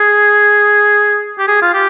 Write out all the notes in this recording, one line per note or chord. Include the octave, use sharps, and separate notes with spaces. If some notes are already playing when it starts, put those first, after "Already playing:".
Already playing: G#4
G4
G#4
F4
G4